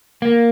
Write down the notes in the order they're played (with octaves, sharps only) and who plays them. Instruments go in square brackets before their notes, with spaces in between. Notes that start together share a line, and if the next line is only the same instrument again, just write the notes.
[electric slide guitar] A#3